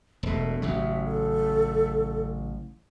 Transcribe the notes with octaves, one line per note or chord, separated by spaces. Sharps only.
E1 B2 A3
A1 C#3 F#3 E5
A4